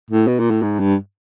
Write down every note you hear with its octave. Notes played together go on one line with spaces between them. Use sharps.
A2
B2
A#2
A2
G#2
G2